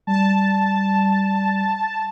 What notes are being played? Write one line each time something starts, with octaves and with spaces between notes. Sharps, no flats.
G3 A5